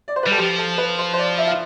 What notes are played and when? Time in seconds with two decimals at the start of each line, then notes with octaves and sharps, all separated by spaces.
0.08 D5
0.16 C5
0.23 B4
0.27 G3 A4
0.38 F3 G4
0.58 A4
0.78 B4
0.98 C5
1.13 C5
1.18 D5
1.38 E5
1.47 F5